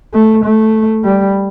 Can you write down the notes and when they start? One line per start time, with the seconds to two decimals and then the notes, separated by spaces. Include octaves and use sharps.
0.14 A3
0.44 A3
1.04 G3